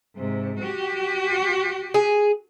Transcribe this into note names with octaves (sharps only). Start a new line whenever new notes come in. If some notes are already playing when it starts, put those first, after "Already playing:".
G#2 C3
F#4 G4
G#4